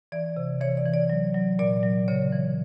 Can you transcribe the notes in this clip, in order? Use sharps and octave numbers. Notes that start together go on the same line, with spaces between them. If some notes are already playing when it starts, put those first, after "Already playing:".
E3 D5
C3
E3 C#5
D5
E3
D5
F#3
F#3
A#2 D5
F#3
C#3 C#5
E3